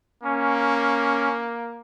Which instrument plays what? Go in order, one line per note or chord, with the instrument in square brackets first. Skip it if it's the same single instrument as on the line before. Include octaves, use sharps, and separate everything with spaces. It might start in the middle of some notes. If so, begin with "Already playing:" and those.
[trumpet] A#3 [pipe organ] C#4